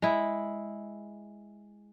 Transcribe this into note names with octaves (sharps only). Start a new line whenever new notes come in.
G#3 E4